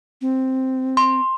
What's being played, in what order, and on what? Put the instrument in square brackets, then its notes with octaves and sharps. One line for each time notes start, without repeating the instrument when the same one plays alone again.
[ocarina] C4
[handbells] C6